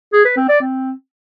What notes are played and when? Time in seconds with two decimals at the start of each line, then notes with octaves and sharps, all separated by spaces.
0.13 G#4
0.25 B4
0.37 C4
0.49 D5
0.61 C4